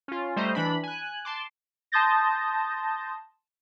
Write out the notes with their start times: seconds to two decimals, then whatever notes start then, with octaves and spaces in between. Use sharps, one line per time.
0.08 C#4 F4
0.36 G3 A3 C5 D#5 A#5
0.55 E3 D4 B5
0.83 G#5 F#6
1.25 A5 C6 D6
1.92 A5 C6 D#6 G6 A6 A#6